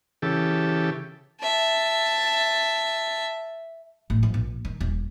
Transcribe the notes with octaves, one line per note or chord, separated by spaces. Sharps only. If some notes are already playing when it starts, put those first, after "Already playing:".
C#3 E3 G4 A4
E5 A5
A1
F3
A#1
D#3
D#1